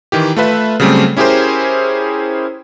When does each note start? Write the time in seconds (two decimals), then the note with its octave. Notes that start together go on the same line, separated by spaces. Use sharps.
0.12 D#3 E3 G4
0.36 A3 F4 B4 E5
0.80 C#3 F#3 G3 A3 C4 C#4
1.17 C#4 E4 G4 G#4 A#4 C5